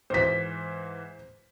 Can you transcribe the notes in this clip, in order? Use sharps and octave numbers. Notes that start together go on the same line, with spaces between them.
G#2 E3 C5 B6